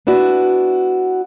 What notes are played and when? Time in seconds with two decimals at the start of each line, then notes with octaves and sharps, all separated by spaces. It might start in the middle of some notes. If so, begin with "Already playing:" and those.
0.07 B3 D4 E4 F#4